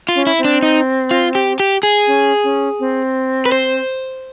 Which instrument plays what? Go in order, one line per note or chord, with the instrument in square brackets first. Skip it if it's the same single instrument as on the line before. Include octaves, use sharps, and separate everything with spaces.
[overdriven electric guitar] F4
[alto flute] C#4
[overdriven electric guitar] E4
[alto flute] C4
[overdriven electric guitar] D4
D#4
F4
G4
G4
G#4
[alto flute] C#4
C#4
C4
[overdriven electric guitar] B4
C5